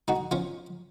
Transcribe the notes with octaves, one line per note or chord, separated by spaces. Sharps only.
D#4 F#4
C#4 F4